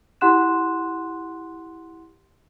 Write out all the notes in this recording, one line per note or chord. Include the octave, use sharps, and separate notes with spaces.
E4 G4 F#5 C6 F#6 E7